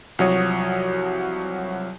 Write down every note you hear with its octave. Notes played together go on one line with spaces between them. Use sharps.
C2 F3 F#3 F#4 C#5 D#6